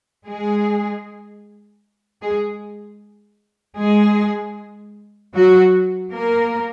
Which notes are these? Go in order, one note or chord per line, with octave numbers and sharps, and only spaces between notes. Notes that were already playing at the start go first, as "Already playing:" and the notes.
G#3 G#4
G#3 G#4
G#3 G#4
F#3 F#4
A#3 A#4